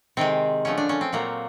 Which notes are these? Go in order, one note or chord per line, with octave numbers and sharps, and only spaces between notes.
C3 D#3 G#3 C4
D3 F3 A3 C#4
D4
C#4
C4
A#2 F#3 A3 A#3